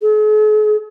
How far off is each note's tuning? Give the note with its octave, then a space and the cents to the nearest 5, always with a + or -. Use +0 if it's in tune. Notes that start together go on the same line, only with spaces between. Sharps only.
G#4 +45